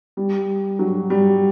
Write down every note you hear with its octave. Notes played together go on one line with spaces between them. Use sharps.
G3
F#3
G3